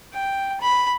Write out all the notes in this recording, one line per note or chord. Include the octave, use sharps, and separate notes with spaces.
G5
B5